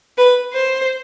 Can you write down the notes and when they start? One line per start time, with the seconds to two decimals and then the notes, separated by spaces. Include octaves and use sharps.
0.18 B4
0.52 C5